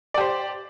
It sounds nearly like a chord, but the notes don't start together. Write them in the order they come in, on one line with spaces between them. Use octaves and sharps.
D5 G4 C5